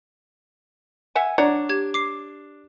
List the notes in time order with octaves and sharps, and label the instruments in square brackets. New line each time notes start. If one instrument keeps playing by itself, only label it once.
[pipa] E5 F#5 G#5
[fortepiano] D4 [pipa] C#5 F#5 A#5 [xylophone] G#6
[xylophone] G4 G#6
D6 C7